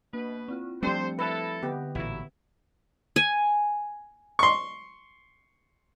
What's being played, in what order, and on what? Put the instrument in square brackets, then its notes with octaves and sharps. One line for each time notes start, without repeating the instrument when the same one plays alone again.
[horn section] B2 B4 [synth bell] A#3 D4
[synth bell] C4 E4 F4
[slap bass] F3 A3 [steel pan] G3 C4 D4 [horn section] C5 [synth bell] C#7
[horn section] E4 A4 [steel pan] B4 [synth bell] E5 A#6
[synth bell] D3 [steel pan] B3 G4
[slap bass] A1 A#2 [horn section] F#3 E4
[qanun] G#5
[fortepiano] C6 C#6